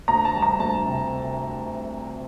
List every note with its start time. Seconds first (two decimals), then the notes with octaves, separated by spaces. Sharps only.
0.08 D2 A#5
0.25 A5
0.34 G3
0.42 A#5
0.59 D2 A5
0.86 C3